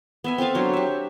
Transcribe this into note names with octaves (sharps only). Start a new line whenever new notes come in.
B3 E5 G#5
C4 A4 B4 F5
F#3 D4 C5 C#5
G4 E5